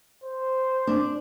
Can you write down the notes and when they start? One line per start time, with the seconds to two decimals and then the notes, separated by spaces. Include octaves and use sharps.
0.24 C5
0.87 D4